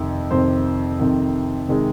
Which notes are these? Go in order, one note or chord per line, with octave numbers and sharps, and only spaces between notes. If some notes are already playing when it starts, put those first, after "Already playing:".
Already playing: F2 C3 D#3
F2 C3 D#3 C5
F2 C3 D#3
C3 D#3 G#3